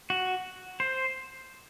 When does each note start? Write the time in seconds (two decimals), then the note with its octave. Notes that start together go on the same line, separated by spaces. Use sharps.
0.10 F#4
0.80 C5